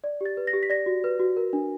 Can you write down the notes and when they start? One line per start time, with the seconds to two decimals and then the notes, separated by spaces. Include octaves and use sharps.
0.04 D5
0.21 G4 A6
0.37 B4
0.47 A#6
0.53 G4
0.63 B6
0.70 D5 A#6
0.86 F#4
1.04 B4
1.19 F#4
1.37 A#4
1.53 D4